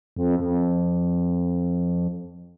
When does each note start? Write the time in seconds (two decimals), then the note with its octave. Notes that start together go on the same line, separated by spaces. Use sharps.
0.16 F2
0.40 F2